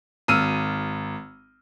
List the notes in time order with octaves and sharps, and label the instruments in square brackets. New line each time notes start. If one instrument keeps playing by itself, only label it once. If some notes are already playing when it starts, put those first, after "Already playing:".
[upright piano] G#1 E6 F6 D#7